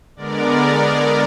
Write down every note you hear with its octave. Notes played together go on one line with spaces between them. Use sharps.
D3 G#3 B3 A#4 D5